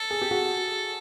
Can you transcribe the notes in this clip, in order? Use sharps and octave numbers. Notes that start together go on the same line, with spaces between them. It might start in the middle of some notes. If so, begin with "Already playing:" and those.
Already playing: A4
G#4
G4
F#4 G#4